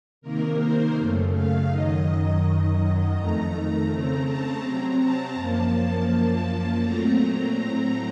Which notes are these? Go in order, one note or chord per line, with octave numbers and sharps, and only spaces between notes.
C3 D#3 A#3 A#4
C5
F#2 C#3 A3
F5
F#2 D#3 F#3 D#5
F#2 D#3 F#3 D#5
F2 D#3 A3 A#5
A#5
C#3 A3 C4
A5
C3 F#3 C4 A#5
A5
F#2 F3 A#3
F#2 F3 A#3 A5
A#2 F#3 A3 C4 A#5
A2 F#3 A3 C4